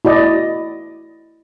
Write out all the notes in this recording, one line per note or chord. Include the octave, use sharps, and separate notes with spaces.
E4 F#4 D5 D#5